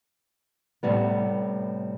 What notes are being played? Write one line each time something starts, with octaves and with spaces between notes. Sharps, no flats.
A2 C3 G3 B3